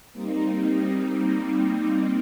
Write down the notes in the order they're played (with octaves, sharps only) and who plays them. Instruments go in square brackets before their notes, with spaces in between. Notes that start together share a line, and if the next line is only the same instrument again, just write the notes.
[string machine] G3 A#3 C4 D#4